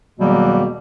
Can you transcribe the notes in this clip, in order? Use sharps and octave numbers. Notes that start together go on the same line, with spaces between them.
E2 B2 D#3 F#3 G3 A#3